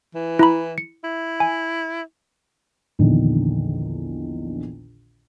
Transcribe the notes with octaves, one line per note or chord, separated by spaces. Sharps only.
E3
E4 A#5 B5
C#7
E4
G#5
A#1 E2 D3 D#3